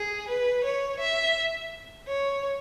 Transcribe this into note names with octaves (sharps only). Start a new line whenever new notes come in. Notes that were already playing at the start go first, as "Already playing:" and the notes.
Already playing: G#4
B4
C#5
E5
C#5